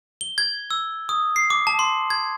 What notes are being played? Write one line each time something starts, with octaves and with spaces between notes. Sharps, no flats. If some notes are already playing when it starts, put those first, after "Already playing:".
G7
G#6
E6
D#6
C7
D6
A5
C6
G#6